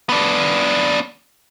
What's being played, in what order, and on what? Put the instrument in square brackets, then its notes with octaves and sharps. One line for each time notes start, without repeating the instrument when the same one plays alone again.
[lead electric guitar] B3 D4